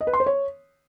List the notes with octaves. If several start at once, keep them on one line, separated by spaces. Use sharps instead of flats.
D#5
B4
C6
C5
C#5